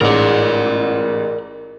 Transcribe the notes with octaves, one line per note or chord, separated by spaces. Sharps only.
A1 G#2 A#4 D5